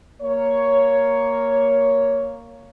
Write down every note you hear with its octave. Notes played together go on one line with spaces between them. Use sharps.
A#3 C#5